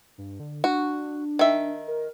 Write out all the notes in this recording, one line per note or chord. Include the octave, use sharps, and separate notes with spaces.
G2
D3
D4 F#4
D#3 E5
A#4